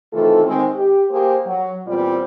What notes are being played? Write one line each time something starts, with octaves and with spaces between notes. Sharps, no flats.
C3 D#3 E3 A3 F4 A4
D#3 G#3 C4
G4
A#3 G4 G#4 C5
F#3
E2 A#2 G3 C4 F4